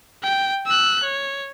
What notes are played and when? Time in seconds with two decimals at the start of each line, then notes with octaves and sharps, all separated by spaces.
0.24 G5
0.67 E6 F#6
1.03 C#5